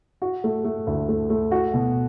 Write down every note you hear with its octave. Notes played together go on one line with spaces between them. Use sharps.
F#4
A3
A3
D2
A3
A3
F#4
B2